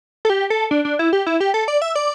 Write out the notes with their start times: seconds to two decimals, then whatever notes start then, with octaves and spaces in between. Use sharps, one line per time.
0.25 A4
0.30 G4
0.50 A4
0.71 D4
0.85 D4
0.99 E4
1.13 G4
1.26 E4
1.40 G4
1.54 A4
1.68 D5
1.82 E5
1.95 D5